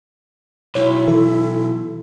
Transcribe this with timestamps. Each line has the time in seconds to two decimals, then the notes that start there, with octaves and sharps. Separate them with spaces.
0.75 B1 E4 C#5
1.08 E3 A4